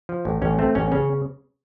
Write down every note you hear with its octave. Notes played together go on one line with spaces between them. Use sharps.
F3
A1
A1 C#4
A3 C4
A1 C#4
C#3 C#4